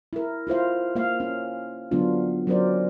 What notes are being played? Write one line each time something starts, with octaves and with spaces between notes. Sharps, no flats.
E4 A#4
E4 F4 C5 F5
A#3 F5
C#4
D3 F#3 B3 D4 F4
F#3 C#4 A#4 C5 D5